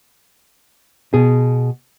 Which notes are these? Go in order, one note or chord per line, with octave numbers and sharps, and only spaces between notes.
B2 G#4